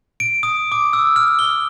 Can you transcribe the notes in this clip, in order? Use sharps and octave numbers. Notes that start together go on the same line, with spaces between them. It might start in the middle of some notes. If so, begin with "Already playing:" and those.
D7
D#6
D6
E6
F6
G7